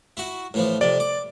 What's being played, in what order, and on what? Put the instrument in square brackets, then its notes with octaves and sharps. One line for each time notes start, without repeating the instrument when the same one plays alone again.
[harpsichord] E4 F#4
A2 E3 F3
[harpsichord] F2 C3 [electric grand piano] D5
[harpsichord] D6